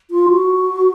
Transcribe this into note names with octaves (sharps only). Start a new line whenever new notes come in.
F4
F#4